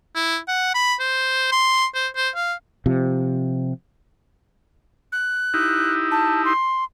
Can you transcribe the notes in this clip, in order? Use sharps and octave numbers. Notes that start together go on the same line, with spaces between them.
E4
F#5
B5
C5
C6
C5
C5
F5
C3 F3
F#6
D#4 E4 G4
A5
C6